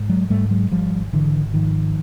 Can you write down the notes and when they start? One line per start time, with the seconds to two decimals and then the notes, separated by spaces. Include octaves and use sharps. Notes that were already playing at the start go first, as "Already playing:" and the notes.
Already playing: G#2
0.09 F#3 G#3
0.30 G#2 G3 A3
0.51 F#3 G#3
0.71 G#1 F3 G3
1.13 G#1 D3 E3
1.54 G#2 D#3 F3